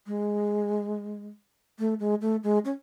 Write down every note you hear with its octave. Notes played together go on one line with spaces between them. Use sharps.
G#3
A3
G#3
A3
G#3
C#4